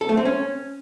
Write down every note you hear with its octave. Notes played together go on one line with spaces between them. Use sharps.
A4
A3
C4
C#4